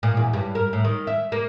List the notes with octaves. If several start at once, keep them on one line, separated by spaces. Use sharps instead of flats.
A#2
E2
G2
A#4
A2
D#3
E5
A#3